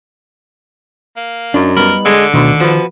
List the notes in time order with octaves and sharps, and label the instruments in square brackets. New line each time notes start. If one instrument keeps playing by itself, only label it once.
[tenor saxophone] A#3
[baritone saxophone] F#2 [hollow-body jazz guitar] D4 D#4
[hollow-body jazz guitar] G3 B3 D#4 [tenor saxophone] A#4 [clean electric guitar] B5
[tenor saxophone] D3 [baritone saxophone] G#3
[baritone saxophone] D2 [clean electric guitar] B2 [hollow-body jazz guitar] D#3
[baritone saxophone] F3 [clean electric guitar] F#4 B4